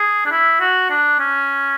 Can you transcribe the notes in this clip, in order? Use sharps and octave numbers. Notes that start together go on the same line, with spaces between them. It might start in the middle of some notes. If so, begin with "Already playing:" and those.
Already playing: G#4
D4
E4
F#4
D4
C#4